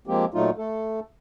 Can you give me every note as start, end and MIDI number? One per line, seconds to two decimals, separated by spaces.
0.07 0.25 53
0.07 0.25 56
0.07 0.25 58
0.07 0.25 60
0.07 0.25 67
0.34 0.50 46
0.34 0.50 54
0.34 0.50 57
0.34 0.50 63
0.34 0.50 65
0.58 1.00 57
0.58 1.00 69